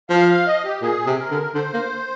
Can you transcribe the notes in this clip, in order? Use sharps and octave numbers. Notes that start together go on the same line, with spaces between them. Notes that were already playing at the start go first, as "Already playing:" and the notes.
F3 F5
F5
D#5
G4
A#2 G#4
C3
A#4
D3
D3 C5
A#3